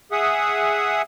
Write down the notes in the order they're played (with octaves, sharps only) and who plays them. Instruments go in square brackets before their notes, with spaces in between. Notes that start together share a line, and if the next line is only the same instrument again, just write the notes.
[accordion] G#4 E5 F#5 D#6